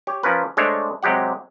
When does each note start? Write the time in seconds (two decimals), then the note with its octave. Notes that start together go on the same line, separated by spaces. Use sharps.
0.07 G4 C#5
0.23 F3 C#4 A#4 B4
0.57 G#3 A3 D4 C5 C#5
1.03 C3 F#3 G#3 G4 F#5